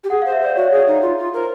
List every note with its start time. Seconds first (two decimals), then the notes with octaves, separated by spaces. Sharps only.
0.04 G4
0.10 G#4 F#5
0.22 F5
0.26 C5
0.32 E5
0.41 C5 D5
0.55 F#4 C#5
0.72 G#4
0.87 D#4
1.02 F4
1.18 F4
1.34 A#4 C5